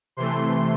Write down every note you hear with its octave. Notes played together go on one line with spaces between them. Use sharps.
C3 E3 A3 C6